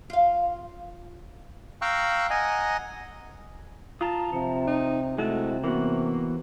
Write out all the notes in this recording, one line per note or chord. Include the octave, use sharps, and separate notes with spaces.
F4 F5
F5 G5 A#5 C#6 E6 F#6
D#5 F#5 G#5 A#5
F4 A5 A#5 D#6
C3 F3
D#4
C3 G#3 A3 E4 F#4
E3 A#3 B3 F#4